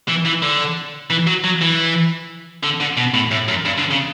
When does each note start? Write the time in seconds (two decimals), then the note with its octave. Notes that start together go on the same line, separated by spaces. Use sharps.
0.08 E3
0.25 E3
0.42 D3
1.10 E3
1.27 F#3
1.44 F#3
1.61 E3
2.63 D3
2.80 D3
2.97 B2
3.14 A2
3.31 A2
3.48 F#2
3.65 G2
3.78 D3
3.91 C#3